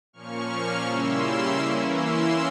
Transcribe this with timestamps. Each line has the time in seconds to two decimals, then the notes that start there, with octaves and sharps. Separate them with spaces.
0.13 A#2 F3 A#3 C#4 C#6 F6
0.85 C#3 G3 A#3 C#4 E4 C6 E6
1.59 E3 A#3 C#4 E4
1.95 C6 E6